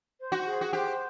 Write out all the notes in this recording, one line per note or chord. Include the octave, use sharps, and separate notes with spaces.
C5
F#4
G#4
F#4
G4 C5